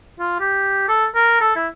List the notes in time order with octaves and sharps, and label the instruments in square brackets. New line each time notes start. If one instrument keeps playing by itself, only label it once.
[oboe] F4
G4
A4
A#4
A4
E4